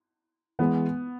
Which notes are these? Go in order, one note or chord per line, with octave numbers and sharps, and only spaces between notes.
E3 G#3 B3